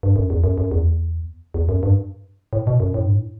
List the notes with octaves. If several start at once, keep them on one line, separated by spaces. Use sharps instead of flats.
G2
F#2
E2
F#2
F#2
E2
E2
F#2
G2
A2
B2
F#2
A2
G2
A2